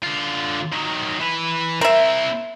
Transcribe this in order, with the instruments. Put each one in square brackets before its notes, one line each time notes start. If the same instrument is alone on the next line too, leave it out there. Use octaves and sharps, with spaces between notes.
[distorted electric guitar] D3 F4
D#3 F#3
E3 B4
[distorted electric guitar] C4 E4 [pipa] A#4 E5